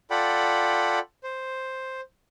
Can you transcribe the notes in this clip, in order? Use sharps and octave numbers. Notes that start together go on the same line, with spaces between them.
F4 A4 D5 F#5 G5 B5
C5